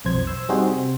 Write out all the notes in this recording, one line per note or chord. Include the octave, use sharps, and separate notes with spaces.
B1 F2 C5 G#6
C5 C6 E6
G3 C4 D#4 F#4 G#4 C5
C3 C5